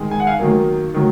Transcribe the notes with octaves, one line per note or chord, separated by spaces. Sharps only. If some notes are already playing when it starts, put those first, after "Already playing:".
Already playing: D#3 G#3
G#5
F#5
F5 G#5
D#3 F#3 A#3
D#3 F#3